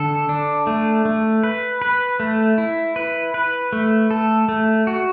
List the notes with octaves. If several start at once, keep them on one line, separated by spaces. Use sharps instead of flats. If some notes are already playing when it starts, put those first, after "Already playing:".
Already playing: D3 A4
D4
A3
A3
B4
B4
A3
E4
B4
B4
A3
A4
A3
F#4